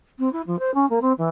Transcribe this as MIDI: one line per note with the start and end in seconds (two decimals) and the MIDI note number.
0.19 0.31 60
0.32 0.41 64
0.46 0.59 53
0.59 0.73 72
0.74 0.87 61
0.89 0.99 58
1.01 1.12 60
1.18 1.29 52